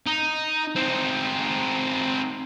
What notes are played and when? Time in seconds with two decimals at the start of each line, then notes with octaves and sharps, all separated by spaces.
0.06 D#4
0.76 C4 D#4